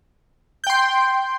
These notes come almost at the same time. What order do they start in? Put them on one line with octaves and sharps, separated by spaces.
G6 G5 C6